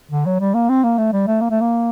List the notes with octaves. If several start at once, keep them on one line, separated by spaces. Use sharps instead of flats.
D3
F#3
G3
A#3
C4
A#3
A3
G3
A3
A#3
A3
A#3